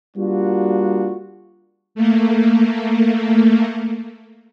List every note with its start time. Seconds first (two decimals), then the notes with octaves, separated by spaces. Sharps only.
0.17 G3 A#3 D4 F4 F#4
1.95 A3 A#3